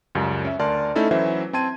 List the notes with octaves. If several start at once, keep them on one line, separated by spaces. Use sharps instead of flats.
C#2 F#2 G3
C#4 E5
D2 A#4 D5 A5 C6 F6
A3 C#4 D#4 E4 A4
E3 F#3 C#4 C5 E5
C4 G5 A5 C6 G#6 D#7